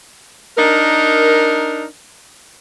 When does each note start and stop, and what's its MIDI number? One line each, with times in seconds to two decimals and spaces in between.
0.57 1.85 62
0.57 1.85 63
0.57 1.85 70